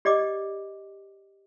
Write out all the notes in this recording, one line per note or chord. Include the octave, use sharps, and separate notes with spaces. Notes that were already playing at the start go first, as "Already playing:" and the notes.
G4 D5 D#5 D6